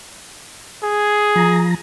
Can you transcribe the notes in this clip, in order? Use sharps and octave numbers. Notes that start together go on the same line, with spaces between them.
G#4
F3 A#5